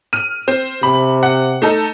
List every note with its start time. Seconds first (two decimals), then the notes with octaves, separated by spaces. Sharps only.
0.13 F6 D#7
0.48 C4
0.83 C3 B5
1.23 F#5
1.62 A3 D#4 A4